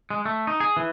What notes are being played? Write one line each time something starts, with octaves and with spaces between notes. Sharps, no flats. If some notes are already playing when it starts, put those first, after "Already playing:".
G#3
A3
D#4
G#4
E3